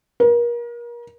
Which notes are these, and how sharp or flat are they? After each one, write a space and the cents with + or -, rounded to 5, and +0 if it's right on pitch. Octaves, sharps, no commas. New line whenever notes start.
A#4 +35